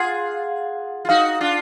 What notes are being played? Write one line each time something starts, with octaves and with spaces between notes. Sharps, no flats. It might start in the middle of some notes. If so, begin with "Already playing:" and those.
Already playing: F4 G#4 F#5
F4
D#4 F#4 F5
D4 F4